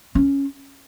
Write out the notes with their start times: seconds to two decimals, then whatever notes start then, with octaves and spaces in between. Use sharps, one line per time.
0.15 C#4